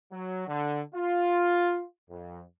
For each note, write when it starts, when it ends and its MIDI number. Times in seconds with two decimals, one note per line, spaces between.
0.12 0.45 54
0.48 0.81 50
0.95 1.83 65
2.10 2.40 41